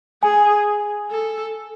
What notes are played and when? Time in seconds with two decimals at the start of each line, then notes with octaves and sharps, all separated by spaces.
0.23 G#4 G#5
1.10 A4